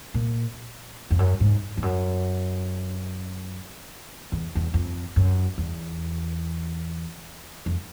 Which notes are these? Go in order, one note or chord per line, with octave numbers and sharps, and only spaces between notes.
A#2
F2
F#2
G#2
F2
F#2
E2
E2
F2
F#2
E2
F2